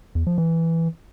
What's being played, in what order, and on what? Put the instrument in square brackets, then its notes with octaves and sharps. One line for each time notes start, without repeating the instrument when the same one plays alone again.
[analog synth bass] E2
F3
E3